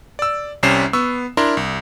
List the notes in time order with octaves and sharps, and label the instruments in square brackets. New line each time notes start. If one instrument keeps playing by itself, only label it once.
[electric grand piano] D5 E6
C2 C3 G3 C#4 C7 E7
B3 C#6 E6
D4 E4 A#4 A#5 C6
C2